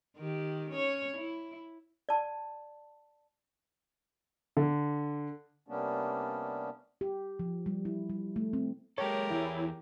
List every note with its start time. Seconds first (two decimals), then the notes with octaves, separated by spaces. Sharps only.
0.17 D#3 G4
0.71 C#4 C#5
1.17 E4
2.09 D5 A5
4.57 D3
5.68 C3 G3 A#3 B3 C#4 D4
7.01 G4
7.39 F3
7.66 G3
7.85 E4
8.10 G3
8.36 A3
8.53 C4
8.98 G#3 G4 A4 A#4 C#5
9.30 E2 E4 G#4